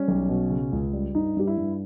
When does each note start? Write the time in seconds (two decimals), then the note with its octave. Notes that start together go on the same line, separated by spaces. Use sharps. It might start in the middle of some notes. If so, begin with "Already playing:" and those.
Already playing: G3 C#4
0.08 B1
0.29 B2
0.50 C#3
0.72 C#2
0.93 G3
1.15 G2 D#4
1.37 G2 G4
1.47 E4
1.58 G2